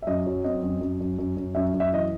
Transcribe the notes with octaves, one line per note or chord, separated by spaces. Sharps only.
E5
F#2 D#5
F#3
C4 D#5
F#2
F#2
F#2
F#2
F#2
F#2 E5
F#2
E5
E3 D#5